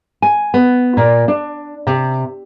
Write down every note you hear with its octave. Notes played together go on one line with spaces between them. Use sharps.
G#5
B3
A#2
D4
C3